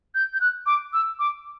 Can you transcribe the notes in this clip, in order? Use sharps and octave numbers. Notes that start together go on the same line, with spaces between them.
G6
G6
F#6
D6
E6
D6